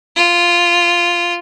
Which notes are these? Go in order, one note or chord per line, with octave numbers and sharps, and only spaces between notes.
F4